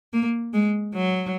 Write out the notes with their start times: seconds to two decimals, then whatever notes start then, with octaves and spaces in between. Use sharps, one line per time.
0.13 A#3
0.54 G#3
0.95 F#3